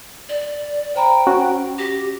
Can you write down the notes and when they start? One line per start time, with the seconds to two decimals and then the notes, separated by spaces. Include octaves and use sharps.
0.29 D5
0.96 C5 G5 A#5 B5
1.27 C#4 F#4
1.78 G4 A#6